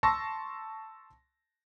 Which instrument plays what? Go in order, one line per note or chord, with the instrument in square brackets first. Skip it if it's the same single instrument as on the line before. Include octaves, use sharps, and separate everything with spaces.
[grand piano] A5 C6 C#6 E6 A#6